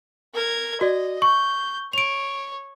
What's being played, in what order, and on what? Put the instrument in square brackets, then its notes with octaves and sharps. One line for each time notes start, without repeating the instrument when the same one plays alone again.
[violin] A#4 G#6
[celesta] F#4 D5 [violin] D#5
[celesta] C#6 [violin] G6
[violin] C#5 [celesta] D7 F7